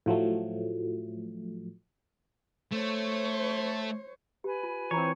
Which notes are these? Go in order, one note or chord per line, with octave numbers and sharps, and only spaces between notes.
A2 F3 F#3 A3
A3 C5 C#5
G4 B4 G#5
F4
E3 C4 F4 C#5 A#5 C#6